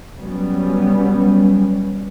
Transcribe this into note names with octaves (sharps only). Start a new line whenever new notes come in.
F#3 G3 B3 C#4